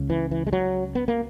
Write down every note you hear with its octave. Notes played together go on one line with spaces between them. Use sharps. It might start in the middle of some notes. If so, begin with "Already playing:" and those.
Already playing: C#2 C#3
E3
E3
G#3
F#3
B3
A#3